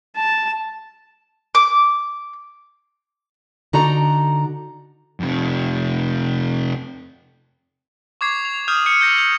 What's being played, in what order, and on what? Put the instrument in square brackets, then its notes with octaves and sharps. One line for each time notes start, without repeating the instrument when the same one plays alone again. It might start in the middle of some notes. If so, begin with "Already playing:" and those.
[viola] A5
[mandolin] D6
[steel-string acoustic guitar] D3 D#4 F#4 D5 A#5
[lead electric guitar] F2 C3
[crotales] C#6 D6 G#6 C7
F7
D#6 F6 G6 D#7 F7
F6 G6 C#7 D#7
E6 G6 A#6
G6